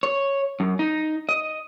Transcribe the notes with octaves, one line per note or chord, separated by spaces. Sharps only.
C#5
F#2
D#4
D#5